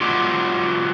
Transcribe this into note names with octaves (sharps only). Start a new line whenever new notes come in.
F#3 G#3 B3 D4 F4 G4